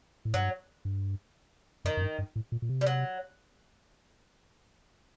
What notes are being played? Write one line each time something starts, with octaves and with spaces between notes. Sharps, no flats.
A2
G2 F#3
G2
F#2 D#3
F#2
G2
G2
A2
A#2
A#2
C3
G3
F#3